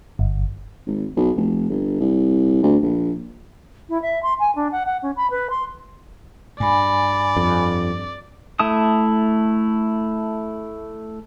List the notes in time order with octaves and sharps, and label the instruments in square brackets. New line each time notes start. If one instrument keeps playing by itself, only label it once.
[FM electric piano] G1
[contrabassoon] G#1
B1
F1
G1
C2
D2
A#1
[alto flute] E4
E5
C6
G#5
D4
F#5
F#5
C#4
B5
B4
C6
[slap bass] G2 [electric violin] D5 [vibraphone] G#5 B5
[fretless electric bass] F2
[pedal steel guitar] A3 E4 A5 D#6